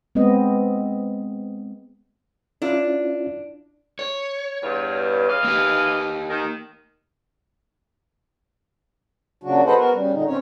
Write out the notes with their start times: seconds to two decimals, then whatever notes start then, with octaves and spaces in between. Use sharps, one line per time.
0.15 G#3 B3 C4 D#5
2.62 C#4 D4 E4 F4
3.99 C#5
4.63 E2 G2
5.29 E3 D#5 F5
5.44 A#3 G4
6.29 D#3
9.44 A#2 C#3 F#3 D4 F#4
9.66 G#4 A4 B4 C5 D#5 F#5
9.78 B3 F#4 A#4
9.93 C#3 G3
10.13 A#2 D3 D#4
10.27 C4 C#4 C#5